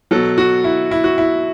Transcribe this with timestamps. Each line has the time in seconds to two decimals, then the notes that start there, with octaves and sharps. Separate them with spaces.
0.11 B2 F#3 A4
0.38 F#4
0.64 E4
0.91 E4
1.04 F#4
1.18 E4